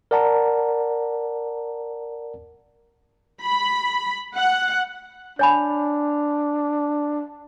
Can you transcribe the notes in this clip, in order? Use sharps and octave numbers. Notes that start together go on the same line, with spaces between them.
A#4 D5 F#5 A5 A#5
B5
F#5
D4 C#5 G#5 B5